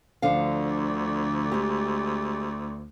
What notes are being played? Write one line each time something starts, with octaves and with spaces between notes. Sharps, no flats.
D2 D3 F3 F5
G#3 G4